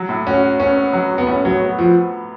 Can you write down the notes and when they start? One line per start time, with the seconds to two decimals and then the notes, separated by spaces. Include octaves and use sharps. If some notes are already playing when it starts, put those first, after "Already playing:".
Already playing: F#3
0.09 A2
0.27 C#4 F#4
0.43 F#4
0.59 B3 C#4
0.76 B3
0.93 F#3
1.11 F#4
1.18 B3
1.27 A2 C#4
1.44 F#3 B3
1.61 B3
1.78 F3 F#4